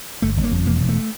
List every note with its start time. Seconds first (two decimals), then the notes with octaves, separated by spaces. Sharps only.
0.22 G1 A3
0.37 G1
0.44 A#3
0.51 F2
0.66 E1 A#3
0.81 E1
0.89 A3